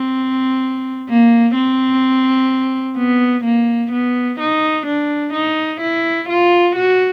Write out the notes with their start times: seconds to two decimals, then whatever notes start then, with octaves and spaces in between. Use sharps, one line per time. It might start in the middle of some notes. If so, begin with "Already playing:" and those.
Already playing: C4
1.09 A#3
1.55 C4
2.97 B3
3.44 A#3
3.92 B3
4.40 D#4
4.86 D4
5.33 D#4
5.81 E4
6.29 F4
6.75 F#4